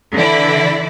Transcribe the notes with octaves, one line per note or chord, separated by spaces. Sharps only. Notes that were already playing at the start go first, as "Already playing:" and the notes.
D3 E3 E4 D5